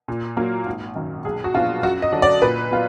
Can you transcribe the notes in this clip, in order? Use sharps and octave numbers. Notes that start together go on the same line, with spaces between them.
A#2
F#3 A#3
G#1
F#2 D#3
B1 G#4
F#4
A#2 F3 B3 D4 F4
F#2 F#4
D#5
D3 F#3 D4
D5
A#2 B4
F#3 B3 F4